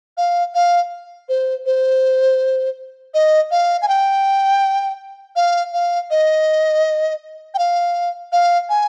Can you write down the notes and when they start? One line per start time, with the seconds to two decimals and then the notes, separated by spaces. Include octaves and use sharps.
0.17 F5
0.55 F5
1.29 C5
1.66 C5
3.14 D#5
3.51 F5
3.82 G#5
3.88 G5
5.36 F5
5.73 F5
6.11 D#5
7.54 G5
7.59 F5
8.32 F5
8.70 G#5